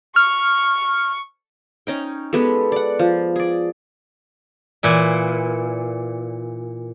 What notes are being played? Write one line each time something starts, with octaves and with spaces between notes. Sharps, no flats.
C#6 F6
C#4 D#4 G5
G#3 B3 G4 A4
D5 F#5
F3
G#4 D5
A#2 E3 E4